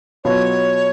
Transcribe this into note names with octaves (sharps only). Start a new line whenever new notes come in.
B2 F#3 B3 F4 C#5